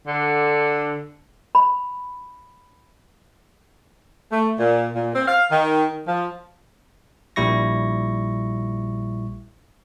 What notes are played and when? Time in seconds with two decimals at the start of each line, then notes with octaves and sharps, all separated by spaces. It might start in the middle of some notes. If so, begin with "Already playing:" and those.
0.07 D3
1.55 B5
4.32 A3
4.60 A#2
4.95 A#2
5.15 C4
5.28 F5
5.52 D#3
6.08 F3
7.36 A#1 A#2 G3 E4 C#6 A#6